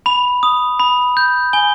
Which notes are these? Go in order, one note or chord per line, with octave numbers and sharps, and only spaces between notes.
B5 F7
D#6
B5
G6
G#5 G7